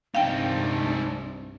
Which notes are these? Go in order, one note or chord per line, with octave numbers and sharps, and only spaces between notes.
C2 G2 C3 C4 D4 D#4 F5 G5